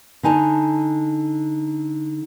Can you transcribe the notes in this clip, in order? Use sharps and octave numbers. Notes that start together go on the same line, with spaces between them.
D3 D#4 G#5 A5